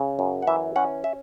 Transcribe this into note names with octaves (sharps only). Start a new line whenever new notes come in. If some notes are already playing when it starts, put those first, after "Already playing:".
Already playing: C#3
F#2
F#5
E3 E5
C#4 F#5
E5